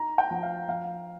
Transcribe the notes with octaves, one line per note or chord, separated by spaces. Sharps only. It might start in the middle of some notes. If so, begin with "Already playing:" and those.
Already playing: D#4 A#5
G5
F3
F5
F3 F5